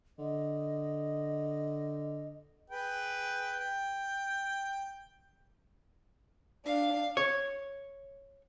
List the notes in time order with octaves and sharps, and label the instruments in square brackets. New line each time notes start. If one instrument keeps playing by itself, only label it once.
[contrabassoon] D3 [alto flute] D#5
[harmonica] G#4 B4 G5
G5
[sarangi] D4 [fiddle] F5
[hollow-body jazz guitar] C#5